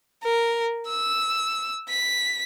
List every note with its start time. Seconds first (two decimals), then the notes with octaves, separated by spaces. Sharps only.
0.24 A#4
0.88 E6
1.89 B6